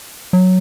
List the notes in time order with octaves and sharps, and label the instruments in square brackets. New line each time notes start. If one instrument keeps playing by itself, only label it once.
[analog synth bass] F#3